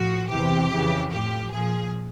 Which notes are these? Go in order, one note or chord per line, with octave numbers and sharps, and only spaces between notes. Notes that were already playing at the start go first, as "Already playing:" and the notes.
Already playing: A2 F3 F#4
E2 C3 E3 G4
F2 C#3 E3
A2 F3 G4
A#2 F3 G#4